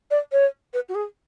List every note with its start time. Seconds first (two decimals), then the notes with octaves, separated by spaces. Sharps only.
0.10 D5
0.32 C#5
0.73 B4
0.88 F#4
0.94 G#4